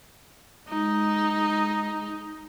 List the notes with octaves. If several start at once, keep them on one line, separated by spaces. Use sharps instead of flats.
G#3 D#4